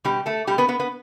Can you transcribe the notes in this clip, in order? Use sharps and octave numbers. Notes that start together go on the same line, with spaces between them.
B2 G3 G4
A3 A4
B2 G3 G4
B3 B4
B3 B4
B3 B4